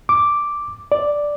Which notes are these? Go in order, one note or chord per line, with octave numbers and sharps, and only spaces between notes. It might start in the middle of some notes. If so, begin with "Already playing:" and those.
D6
D5